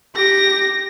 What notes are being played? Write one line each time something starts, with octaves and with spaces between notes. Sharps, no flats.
G4 A#6